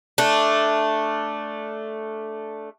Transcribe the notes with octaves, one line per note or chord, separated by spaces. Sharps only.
A3 D4